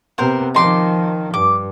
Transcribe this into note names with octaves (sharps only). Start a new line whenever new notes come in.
C3 B3 A#4 C5 F#5
D#3 F3 D#4 C6 D6
G2 D6